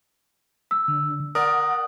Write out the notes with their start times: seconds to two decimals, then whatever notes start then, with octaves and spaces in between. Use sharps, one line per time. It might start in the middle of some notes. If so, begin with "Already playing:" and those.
0.71 E6
0.88 D3
1.35 A#4 D5 F#5 D#6